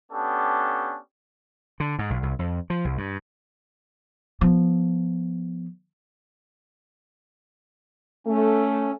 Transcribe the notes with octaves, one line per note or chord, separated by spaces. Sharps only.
B3 C#4 D4 G4 A4
D3
G#2
B1
C2
F2
F3
C2
G2
F3 B3
A3 C#4 A4